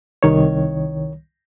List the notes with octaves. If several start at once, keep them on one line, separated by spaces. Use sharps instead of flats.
C2 D#3 C#5